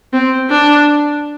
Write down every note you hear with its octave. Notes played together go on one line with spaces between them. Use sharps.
C4
D4